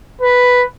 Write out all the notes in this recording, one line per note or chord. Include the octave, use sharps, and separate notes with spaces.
B4